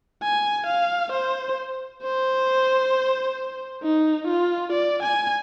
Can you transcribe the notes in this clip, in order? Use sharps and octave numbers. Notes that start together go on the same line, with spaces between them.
G#5
F5
C5
C5
D#4
F4
D5
G#5